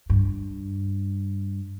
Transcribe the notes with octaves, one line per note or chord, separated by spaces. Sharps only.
G2